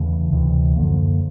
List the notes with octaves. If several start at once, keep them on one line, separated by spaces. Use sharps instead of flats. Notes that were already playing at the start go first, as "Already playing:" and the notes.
Already playing: E2 C#3 E3 A3
D2 C3 E3
F#2 D3 F3 A#3